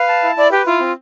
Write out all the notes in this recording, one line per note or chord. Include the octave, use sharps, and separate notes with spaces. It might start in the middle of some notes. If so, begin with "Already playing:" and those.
Already playing: B4 F5
A5
E4
E4 D5
G4 B4
E4 F4
C4